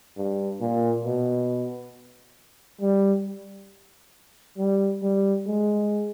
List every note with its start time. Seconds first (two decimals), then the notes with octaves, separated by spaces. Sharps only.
0.17 G2
0.61 A#2
1.05 B2
2.82 G3
4.58 G3
5.02 G3
5.46 G#3